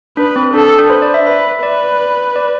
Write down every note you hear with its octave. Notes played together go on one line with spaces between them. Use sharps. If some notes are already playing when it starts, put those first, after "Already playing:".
D4 B4
C4
D4 A4
D4
B4 C5
D5
E5
B4 E5
B4 D5
D5